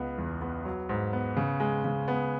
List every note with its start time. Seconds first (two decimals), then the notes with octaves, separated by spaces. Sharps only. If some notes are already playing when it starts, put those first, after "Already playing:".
Already playing: C#2 B3
0.18 E2
0.41 B3
0.65 F#3
0.89 G#2
1.13 B3
1.37 C#3
1.60 G#3
1.84 C#3
2.08 B3